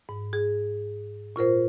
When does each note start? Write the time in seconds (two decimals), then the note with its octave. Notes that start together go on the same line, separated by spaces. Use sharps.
0.09 G#2
0.33 G#4
1.36 A#2 F4 A#4 C5